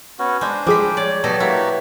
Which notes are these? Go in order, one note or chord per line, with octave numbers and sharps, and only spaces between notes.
B3 C#4 F#4
G#3 D4 C5
F3 G3 G#3 G#4 D6 B6
C#5 D5
B2 F#3 G4 A4 D5 D#5 A5
A#3 E4 F#4 G4